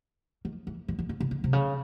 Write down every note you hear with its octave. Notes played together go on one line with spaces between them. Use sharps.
D#3
E3
D#3
D#3
D3
C#3
D3
C3
C#3